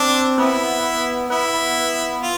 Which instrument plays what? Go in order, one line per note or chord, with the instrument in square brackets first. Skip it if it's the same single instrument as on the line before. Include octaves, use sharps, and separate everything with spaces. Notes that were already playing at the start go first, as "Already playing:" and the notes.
Already playing: [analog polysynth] C4 [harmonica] D4
[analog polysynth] B3 [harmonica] E4
[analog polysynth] B3 [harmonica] E4
[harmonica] F4